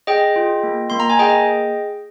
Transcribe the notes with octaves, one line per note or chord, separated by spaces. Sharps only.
G#4 D#5 G5
F4
A#3
A#3 C6
A#5
G#5
G#4 D#5 G5